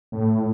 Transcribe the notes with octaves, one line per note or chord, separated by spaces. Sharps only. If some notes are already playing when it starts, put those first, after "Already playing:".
A2